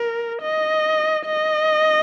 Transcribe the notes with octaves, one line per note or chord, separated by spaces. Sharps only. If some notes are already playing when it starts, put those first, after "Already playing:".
Already playing: A#4
D#5
D#5